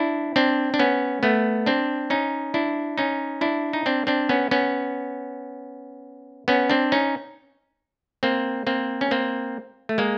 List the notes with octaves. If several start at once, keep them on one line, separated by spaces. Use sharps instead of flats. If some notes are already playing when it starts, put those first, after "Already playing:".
Already playing: D4 E4
C4 D4
D4
B3 C#4
A3 B3
C4 D4
C#4 D#4
D4 E4
C#4 D#4
D4 E4
D#4
C4 D4
C4 D4
B3 C#4
B3 C#4
B3 C#4
C4 D4
C#4 D#4
A#3 C4
A#3 C4
C#4
A#3 C4
A3
G#3 A#3